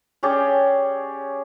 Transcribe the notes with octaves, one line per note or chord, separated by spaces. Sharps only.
C#4 G4 G#4 D5